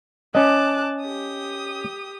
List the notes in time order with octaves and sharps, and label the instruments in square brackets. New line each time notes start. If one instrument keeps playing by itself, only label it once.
[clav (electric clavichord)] C#4 D#5 [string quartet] A5 D6 F#6
[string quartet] G4 D#6